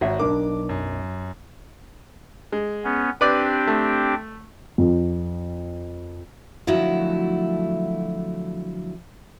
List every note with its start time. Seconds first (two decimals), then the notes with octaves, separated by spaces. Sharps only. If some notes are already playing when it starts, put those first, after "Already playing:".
0.01 G#1 F#4 C#5 E5
0.19 B1 D4 A#4 D6
0.69 F#2
2.52 G#3
2.84 B3 C#4
3.21 C4 D4 G4 B4 D5
3.67 A3
4.78 F2
6.67 D3 F3 F#3 A3 E4 F#4